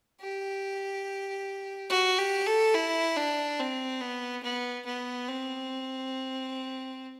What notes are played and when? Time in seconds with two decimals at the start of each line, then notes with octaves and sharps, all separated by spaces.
0.21 G4
1.90 F#4
2.18 G4
2.46 A4
2.74 E4
3.16 D4
3.59 C4
4.01 B3
4.43 B3
4.86 B3
5.28 C4